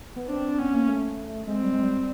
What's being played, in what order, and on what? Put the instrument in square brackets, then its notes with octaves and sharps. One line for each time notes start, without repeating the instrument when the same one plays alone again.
[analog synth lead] B3
[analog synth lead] C4 [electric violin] D4
[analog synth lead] B3 [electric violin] C#4
[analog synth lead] A#3
A3
[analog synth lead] G#3 [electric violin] C4
[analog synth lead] G3
G#3
G3